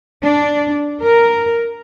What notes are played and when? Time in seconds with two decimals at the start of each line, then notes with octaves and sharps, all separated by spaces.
0.23 D4
1.01 A#4